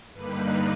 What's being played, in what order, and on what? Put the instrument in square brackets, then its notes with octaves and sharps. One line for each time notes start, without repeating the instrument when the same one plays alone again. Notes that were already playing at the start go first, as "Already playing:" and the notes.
[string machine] G2 D3 G3 A#3 D#4 B4